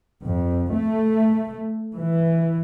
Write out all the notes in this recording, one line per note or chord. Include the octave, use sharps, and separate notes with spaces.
F2
A3
E3